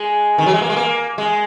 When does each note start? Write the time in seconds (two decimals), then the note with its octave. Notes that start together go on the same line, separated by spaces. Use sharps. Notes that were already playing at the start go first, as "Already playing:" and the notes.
Already playing: G#3
0.38 D#3
0.46 F#3
0.54 G#3
0.62 A#3
0.70 G#3
0.76 A#3
1.18 G#3